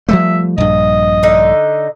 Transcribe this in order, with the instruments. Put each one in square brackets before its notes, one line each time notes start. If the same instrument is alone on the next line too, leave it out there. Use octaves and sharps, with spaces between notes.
[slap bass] F3 G3 A3 [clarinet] E5
[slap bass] A#1 G2 [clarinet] D#5
[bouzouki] D3 D#4